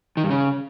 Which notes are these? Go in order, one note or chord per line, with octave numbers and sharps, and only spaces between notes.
D#3
G2
C#3